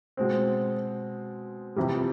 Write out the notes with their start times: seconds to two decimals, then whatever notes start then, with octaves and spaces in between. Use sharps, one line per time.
0.17 B2 G#3 C4
1.76 F2 C3 E3 G3